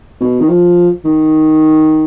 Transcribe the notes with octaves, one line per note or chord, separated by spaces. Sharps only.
B2
D#3
F3
D#3